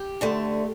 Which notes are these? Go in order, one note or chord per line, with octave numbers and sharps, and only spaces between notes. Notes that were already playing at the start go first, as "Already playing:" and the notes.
Already playing: G4
D2 D3 A3